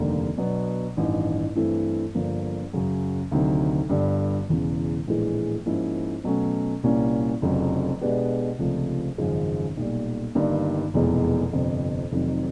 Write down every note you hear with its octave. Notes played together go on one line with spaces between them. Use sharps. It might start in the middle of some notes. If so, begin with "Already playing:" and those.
Already playing: F1 D#2 D3 G3 A#3
B2 F#3 B3 D4
A1 G2 D#3
G2 E3 A3 C4 E4
G1 G2 D3 F3 A#3
F#2 C#3 F#3
D2 C3 D#3 F#3
G1 G2 D3 G3
E1 E2 C#3
A#1 A2 E3 G#3
G#2 F3 A#3 C#4 E4
B2 F#3 A3 C#4
C2 A#2 G3 A#3 C#4
F1 F2 C#3 F#3
B2 G#3 B3 D4 G4
C#2 C3 F3 A3 D4
G#1 F#2 C#3 F3 G#3
B1 A#2 G3
G1 G2 D#3 G3 A#3
F1 E2 B2 G#3
G1 F2 C3
F1 F2 C3 D#3 F#3